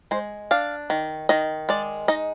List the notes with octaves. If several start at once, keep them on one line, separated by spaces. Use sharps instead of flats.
G#3 C5
D4 F5
D#3
D#3 D#5
G#3 D5
D#4 D#5